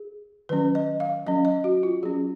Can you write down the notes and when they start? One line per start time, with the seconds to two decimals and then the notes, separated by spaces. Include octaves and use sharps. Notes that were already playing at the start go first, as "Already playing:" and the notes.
Already playing: G#4
0.49 D#3 F#3 C#4 B4
0.75 D#5
1.00 F5
1.26 F#3 C#4 D#5
1.45 D#5
1.64 F#4
1.83 F4
2.03 F#3 C#4 G#4